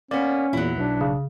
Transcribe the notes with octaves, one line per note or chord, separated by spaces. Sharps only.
A#3 B3 C#4 D5
E2 A#2 F#3 E4
B1 D4
C#3